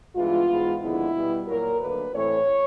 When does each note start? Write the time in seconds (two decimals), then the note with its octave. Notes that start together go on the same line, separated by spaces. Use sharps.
0.15 G2 E3 G#3 B3 F4
0.48 G#2 E3 G#3 B3
0.81 D#2 D3 F3 G#3 B3 E4
1.14 B2 G3 B3
1.47 A#2 F#3 A#3 A#4
1.80 D2 D3 F#3 A#3 B4
2.13 A2 E3 A3 C4 C#5